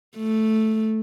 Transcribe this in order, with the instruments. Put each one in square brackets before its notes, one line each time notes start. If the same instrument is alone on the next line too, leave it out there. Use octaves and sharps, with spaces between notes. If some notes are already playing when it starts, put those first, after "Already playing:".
[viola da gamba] A3